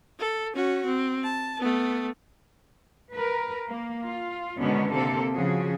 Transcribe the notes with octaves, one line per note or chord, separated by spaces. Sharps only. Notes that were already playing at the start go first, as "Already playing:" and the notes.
A4
C#4 F#4
C4
A5
A3 B3
A#4 B4
A#3
F4
B2 D3 D#3 G#3 B3 C#4
C3 A#3 C4 A4
C#3 F3 F#4 G#4